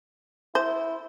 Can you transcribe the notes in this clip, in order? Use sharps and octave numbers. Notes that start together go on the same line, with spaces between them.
E4 C5